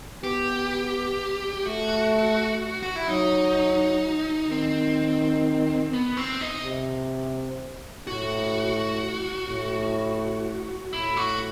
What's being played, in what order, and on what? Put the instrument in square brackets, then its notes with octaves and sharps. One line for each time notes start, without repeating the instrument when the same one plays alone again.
[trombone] B3 [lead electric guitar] G4
[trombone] A3 [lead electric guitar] F#4
[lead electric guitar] F#4
E4
[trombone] F#3 [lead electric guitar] D#4
[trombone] D#3 [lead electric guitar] C4
[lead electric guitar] B3
C4
D#4
[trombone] C3
[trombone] A2 [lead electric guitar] F#4
[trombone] A2
[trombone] A2 [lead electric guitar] E4
[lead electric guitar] F#4